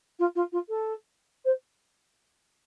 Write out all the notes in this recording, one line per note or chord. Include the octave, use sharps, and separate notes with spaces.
F4
F4
F4
A4
C5